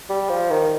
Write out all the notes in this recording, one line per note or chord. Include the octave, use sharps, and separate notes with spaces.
G3
F3
D#3